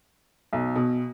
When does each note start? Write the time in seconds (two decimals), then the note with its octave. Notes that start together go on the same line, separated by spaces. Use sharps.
0.53 B1
0.76 B2